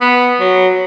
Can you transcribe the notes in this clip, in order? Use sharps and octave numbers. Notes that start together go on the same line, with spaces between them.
B3
F#3